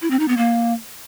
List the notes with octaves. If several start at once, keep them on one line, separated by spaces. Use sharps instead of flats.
E4
C4
D#4
B3
A#3